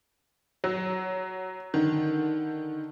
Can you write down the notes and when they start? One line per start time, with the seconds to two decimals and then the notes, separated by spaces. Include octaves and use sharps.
0.64 F#3
1.74 D3 D#3